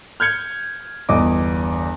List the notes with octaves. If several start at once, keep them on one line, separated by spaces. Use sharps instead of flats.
F6 G6 G#6 C#7 G7
G1 E2 D#5 D6